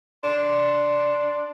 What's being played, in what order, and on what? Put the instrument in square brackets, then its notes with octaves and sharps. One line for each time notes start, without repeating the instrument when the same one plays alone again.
[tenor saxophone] D4 [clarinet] C6